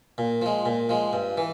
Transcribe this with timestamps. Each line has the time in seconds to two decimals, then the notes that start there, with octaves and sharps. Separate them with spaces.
0.18 A#2
0.42 F3 G#3
0.66 A#2
0.89 F3 G#3
1.13 G2
1.38 E3